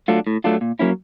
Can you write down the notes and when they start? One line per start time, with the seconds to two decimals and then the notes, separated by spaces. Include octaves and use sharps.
0.08 F#3 A3 D4 F4
0.27 A2
0.44 F#3 A3 D4 F4
0.61 A#2
0.79 F#3 A#3 C#4 E4